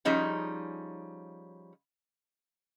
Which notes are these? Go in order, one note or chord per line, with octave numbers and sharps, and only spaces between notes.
F3 G3 C#4 D#4 G#4